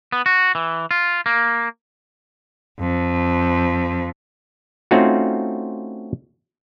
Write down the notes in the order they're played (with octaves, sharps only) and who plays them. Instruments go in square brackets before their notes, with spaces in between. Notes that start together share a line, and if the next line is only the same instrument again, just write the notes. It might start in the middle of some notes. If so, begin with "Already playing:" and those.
[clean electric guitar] B3
F#4
E3
F4
A#3
[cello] F2
[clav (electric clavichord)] A3 C4 C#4 D#4 F4 F#4